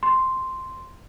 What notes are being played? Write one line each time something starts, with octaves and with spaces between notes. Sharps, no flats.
C6